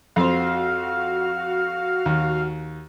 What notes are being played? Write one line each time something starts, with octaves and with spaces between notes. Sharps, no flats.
F2 F#4 C5 F5
D#2